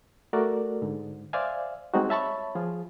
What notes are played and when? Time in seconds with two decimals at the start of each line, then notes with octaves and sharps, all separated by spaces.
0.33 A3 F#4 A4 A#4 D5
0.82 G#2 D3
1.33 C5 D5 E5 F5 G#5
1.94 G3 G#3 C4 D#4 F#4
2.09 C#5 E5 A5 B5 C#6
2.55 F3 F4 G#4